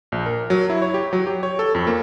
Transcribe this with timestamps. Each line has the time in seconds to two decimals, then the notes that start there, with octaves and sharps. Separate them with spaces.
0.12 A#1
0.26 A#4
0.50 F#3
0.70 E4
0.82 C#5
0.94 G4
1.13 F#3
1.27 G4
1.43 C#5
1.59 A4
1.75 F2
1.87 A#3